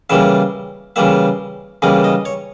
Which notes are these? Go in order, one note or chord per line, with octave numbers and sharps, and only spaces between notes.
C#3 E3 G3 A#3 E5
C#3 E3 G3 A#3 E5
C#3 E3 G3 A#3 D#5
D#5
C#5